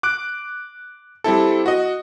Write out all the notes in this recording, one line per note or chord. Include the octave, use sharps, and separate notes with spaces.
D6 F#6 D7
G3 C4 E4 A4
F#4 D#5